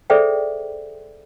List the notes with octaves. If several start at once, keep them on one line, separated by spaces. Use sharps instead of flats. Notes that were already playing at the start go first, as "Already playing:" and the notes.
G#4 A4 C5 D5 E5 G5